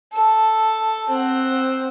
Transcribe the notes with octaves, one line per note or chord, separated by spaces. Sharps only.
A4
C4 F#5